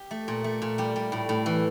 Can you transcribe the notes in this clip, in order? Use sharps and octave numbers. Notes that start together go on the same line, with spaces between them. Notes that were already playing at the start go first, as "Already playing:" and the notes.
Already playing: G4
A3
A#2
A3
A#2
G3 G4
G3
A2
A2
E3